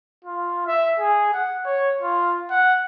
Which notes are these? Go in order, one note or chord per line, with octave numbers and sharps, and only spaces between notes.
F4
E5
G#4
F#5
C#5
F4
F#5